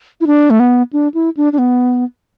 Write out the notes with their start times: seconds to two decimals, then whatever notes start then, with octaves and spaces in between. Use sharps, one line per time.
0.21 E4
0.27 D4
0.50 A3
0.60 B3
0.93 D4
1.14 E4
1.37 D4
1.53 D4
1.58 B3